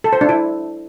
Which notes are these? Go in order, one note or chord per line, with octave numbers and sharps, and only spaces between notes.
A4
C5
D4
E4